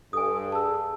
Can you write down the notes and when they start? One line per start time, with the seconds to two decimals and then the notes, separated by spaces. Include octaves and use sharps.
0.13 G2 A4 G#5 D#6
0.52 G#4 A5 E6